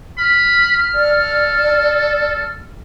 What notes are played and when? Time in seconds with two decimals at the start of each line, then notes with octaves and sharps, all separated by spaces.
0.18 B5 F6
0.95 A4 D5